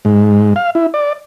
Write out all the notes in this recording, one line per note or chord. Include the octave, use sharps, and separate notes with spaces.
G#2
F5
E4
D5